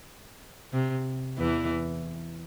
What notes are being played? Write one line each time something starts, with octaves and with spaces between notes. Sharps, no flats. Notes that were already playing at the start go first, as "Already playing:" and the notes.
C3
E2 E3